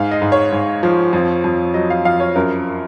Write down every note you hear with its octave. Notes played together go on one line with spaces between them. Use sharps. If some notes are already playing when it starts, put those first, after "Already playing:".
Already playing: G#2 F5
D#5
G#2
C#5
G#2
F3
F2
F2
F#3 D#5
F5
F2 F5
C#5
F#2 A#4